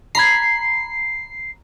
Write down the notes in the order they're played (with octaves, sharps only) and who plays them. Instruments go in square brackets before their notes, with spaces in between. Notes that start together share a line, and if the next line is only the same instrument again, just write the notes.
[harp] A#5 B5 G#6 [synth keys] C7